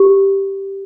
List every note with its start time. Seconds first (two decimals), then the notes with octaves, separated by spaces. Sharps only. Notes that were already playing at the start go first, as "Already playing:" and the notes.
Already playing: G4